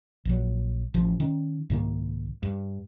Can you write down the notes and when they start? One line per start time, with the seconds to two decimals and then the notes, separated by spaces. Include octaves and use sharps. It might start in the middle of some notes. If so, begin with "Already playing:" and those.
0.25 A#1 F#3
0.94 A1 F3
1.20 D#3 C#4
1.70 C2 G#2 D#3 A#3
2.43 G2